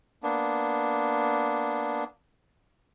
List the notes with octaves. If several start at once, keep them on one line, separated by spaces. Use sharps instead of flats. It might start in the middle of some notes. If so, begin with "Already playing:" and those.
A#3 B3 D4